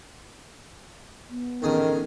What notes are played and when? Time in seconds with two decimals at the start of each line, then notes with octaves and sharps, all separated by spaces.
1.30 B3
1.62 A1 D2 D#3 G#4